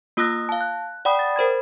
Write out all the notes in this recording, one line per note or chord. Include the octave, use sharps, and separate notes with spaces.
A#3 F4 D#6 E6 F#6 A#6
F5 A5
F#6
D5 F#5 G5 B5 D#6
A6
A#4 C5 B5 G#6